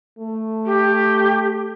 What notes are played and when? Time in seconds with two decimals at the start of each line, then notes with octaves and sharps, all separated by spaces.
0.19 A3
0.66 G4